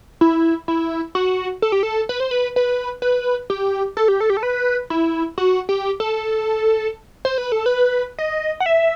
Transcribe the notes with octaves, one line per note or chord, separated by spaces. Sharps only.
E4
E4
F#4
A4
G4
A4
B4
C5
B4
B4
B4
G4
A4
G4
A4
G4
A4
B4
E4
F#4
G4
A4
C5
B4
A4
B4
D#5
F#5
E5